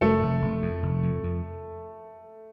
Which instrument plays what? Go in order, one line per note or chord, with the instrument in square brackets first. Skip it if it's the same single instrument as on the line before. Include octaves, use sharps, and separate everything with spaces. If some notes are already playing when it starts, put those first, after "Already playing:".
[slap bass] F1 [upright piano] A3 A4
[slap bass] F1
F1
F2
F1
F2
F2